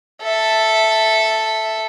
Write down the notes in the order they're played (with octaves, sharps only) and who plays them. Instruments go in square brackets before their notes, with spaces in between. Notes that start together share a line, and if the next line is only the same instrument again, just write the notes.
[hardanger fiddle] A4 E5